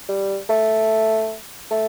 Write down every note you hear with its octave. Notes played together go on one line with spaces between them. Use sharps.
G3
A3
A3